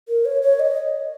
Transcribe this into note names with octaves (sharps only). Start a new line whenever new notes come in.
A#4
C#5
C#5
D#5